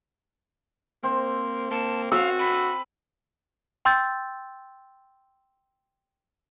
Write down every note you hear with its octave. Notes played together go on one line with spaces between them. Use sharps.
A#3 C4 C5
A#3 A5
F#4 F5 E6
B5
G5 C6 E6 G6 A6